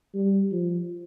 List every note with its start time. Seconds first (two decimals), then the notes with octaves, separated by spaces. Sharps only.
0.14 G3
0.52 F3